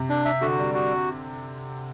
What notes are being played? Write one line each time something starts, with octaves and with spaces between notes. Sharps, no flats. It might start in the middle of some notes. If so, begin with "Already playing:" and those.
Already playing: C3
D4
E5
D3 F#4
G3
F#4